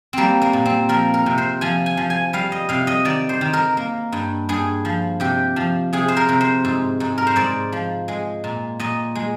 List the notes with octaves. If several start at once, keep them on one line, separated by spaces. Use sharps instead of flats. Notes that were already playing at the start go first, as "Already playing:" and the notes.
G3 A#3 C4
A#3
A#2
C4
F3 A#4
A#4
C3
C5
F3 G#5
G#5
F3
G#5
G3 F5
D#5
C3 F5
D#5
D#3 D5
C5
D#3
A#4
A#3
G2
G2 G#4
F3
C3 G4
F3
C3 G#4
C5
A#4
C3
C5
G#2
G#2
A#4
C5
G#2 D5
F3
G#3
A#2
A#2 D#5
G#3